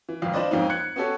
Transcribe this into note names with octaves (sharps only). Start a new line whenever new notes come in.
E3
G#1 F2 A2 F5
D4 F4 B4 C5 D5 D#5
F2 G#2 A#3 C4 C#4 D#4
F#6 G#6 C#7
B3 C#4 F#4 G4 A4 C#5